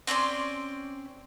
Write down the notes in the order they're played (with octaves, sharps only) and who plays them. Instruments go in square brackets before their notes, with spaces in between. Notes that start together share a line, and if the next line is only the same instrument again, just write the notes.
[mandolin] C4 C#4 D5 C6